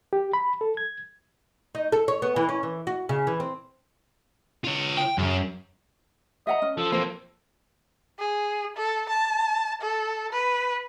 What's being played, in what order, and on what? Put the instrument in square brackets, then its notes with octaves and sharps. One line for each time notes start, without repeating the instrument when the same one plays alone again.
[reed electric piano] G4
B5
A4
G#6
[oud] D#4
A4
C#5
B3
E3
C#4
E3
F#4
C#3
E3
C4
[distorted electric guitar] F4 C#5
[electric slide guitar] G5
[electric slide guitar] F#2 [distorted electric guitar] C#3
[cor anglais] D#5 [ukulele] E5 F#5 A#5
[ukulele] C#4
[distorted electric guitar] F3 [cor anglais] A4
[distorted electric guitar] F2 A#3 [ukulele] C5
[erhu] G#4
A4
A5
A4
B4